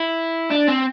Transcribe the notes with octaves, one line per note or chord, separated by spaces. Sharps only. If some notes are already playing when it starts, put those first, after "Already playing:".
Already playing: E4
D4
C4